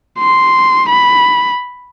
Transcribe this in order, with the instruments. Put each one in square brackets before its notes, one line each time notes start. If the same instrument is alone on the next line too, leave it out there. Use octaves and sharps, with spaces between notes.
[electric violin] C6
B5